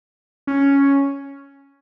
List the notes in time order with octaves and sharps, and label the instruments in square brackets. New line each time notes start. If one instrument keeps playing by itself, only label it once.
[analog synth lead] C#4